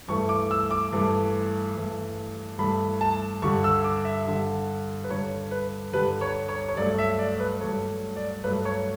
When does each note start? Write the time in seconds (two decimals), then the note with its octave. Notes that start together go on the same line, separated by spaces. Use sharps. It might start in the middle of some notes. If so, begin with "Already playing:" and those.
0.08 G2 E3 A3 C#6
0.29 D6
0.51 E6
0.71 D6
0.93 G2 E3 A3
1.76 G2 E3 A3
2.59 G2 E3 A3 B5
3.01 A5
3.42 G2 D3 G3 C#6
3.64 E6
3.84 D6
4.05 E5
4.26 G2 D3 G3
5.04 B4
5.09 G2 D3 G3 C#5
5.51 B4
5.93 G2 D3 G3 B4
6.21 C#5
6.49 C#5
6.68 C#5
6.77 G2 F#3 A3 D5
6.99 E5
7.19 D5
7.40 B4
7.61 G2 F#3 A3 C#5
8.16 D5
8.44 G2 F#3 A3 B4
8.65 C#5